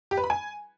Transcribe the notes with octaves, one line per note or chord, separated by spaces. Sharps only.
G4
B4
B5
G#5